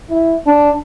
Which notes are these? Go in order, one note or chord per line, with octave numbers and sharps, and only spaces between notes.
E4
D4